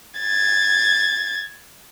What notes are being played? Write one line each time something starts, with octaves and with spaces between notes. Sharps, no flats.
G#6 A6